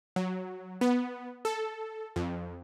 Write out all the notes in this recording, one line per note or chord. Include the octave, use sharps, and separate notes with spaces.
F#3
B3
A4
F2